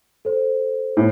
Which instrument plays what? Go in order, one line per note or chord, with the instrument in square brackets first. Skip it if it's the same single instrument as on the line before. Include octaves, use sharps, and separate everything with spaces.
[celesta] A4 C5
[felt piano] A2